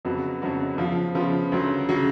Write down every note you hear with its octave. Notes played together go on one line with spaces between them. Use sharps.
F2 C#3 F#3 B3 F#4
F2 C#3 F#3 B3 F#4
C#3 F3 B3 F4
C#3 F3 B3 F4
D2 C#3 F#3
C#3 F#3